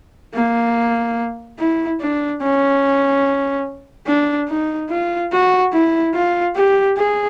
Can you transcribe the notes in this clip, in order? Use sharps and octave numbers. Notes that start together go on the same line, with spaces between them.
A#3
E4
D4
C#4
D4
D#4
F4
F#4
E4
F4
G4
G#4